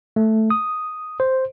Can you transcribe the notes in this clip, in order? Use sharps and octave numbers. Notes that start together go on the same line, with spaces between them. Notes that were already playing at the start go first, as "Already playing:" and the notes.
A3
D#6
C5